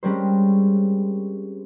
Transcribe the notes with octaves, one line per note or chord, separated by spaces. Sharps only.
G3 G#3 C4 C#4 A#4 C5